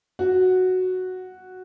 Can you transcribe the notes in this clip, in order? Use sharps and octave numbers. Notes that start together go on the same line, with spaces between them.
F#4